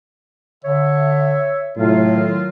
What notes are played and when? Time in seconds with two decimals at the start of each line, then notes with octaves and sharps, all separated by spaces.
0.65 D3 C#5 E5
1.77 A2 C3 F#3 F4
2.13 D#3